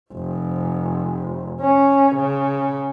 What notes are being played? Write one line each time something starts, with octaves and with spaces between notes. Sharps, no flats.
F1
C#4
C#3